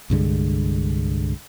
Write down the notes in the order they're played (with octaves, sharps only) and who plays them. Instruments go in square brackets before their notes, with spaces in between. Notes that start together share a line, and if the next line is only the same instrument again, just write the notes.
[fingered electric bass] C2 G2 D3 G#3